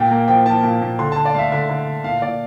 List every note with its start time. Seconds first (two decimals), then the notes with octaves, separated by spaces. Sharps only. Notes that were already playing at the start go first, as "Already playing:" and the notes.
Already playing: A#2 G5
0.11 A#3
0.28 F3 G5
0.46 F3 A5
0.63 A#2
0.82 A#2
0.99 D3 C6
1.12 D3 A5
1.25 D5
1.34 A3 E5 F5
1.52 D3 E5
1.69 D3
1.87 D3
2.04 A#2 F5
2.22 A#2 D5